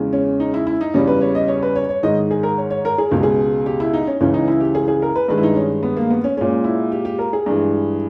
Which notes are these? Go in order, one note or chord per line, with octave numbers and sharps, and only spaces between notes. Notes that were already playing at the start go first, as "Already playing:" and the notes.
Already playing: E2 C#3 G#3
C#4
D#4
E4
E4
D#4
E2 C#3 G3 C#4
B4
C#5
D#5
C#5
B4
C#5
C#5
G#2 D#3 G#3 D#5
G#4
A#4
C#5
C#5
A#4
G#4
C#2 B2 G#3 G4
G#4
G4
E4
D#4
C#4
C#2 C#3 E3 C#4
D#4
E4
G4
G#4
G#4
A#4
B4
G2 D#3 G#3 B4
E4
D#4
C#4
B3
A#3
B3
C#4
A#2 G#3 C#4
E4
G4
G4
A#4
G#4
G2 E3 G#3